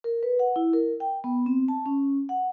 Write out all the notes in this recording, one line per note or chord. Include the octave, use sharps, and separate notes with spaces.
A#4
B4
F#5
E4
A#4
G5
B3
C4
A5
C#4
F#5